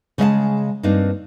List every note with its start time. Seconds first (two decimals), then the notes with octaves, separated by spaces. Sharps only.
0.18 C#3 G#3 E5 A5
0.83 G2 A#3 C4 D4 D#4